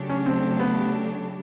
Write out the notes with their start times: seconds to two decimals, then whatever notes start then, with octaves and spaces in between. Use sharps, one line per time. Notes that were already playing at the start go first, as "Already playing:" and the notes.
Already playing: C#3 F#3 A3 D4 G4
0.09 C#4
0.26 C4
0.59 B3